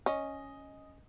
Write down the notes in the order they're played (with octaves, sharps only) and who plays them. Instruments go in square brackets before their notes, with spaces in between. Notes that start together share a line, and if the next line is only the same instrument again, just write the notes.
[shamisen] C#4 [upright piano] D#5